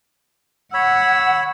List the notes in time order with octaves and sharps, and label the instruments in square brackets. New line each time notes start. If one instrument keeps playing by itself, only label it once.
[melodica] C#5 B5 [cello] F#5 [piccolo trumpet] E6